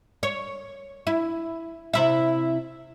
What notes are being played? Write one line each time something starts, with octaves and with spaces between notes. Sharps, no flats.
C#5
E4
C3 E4 E5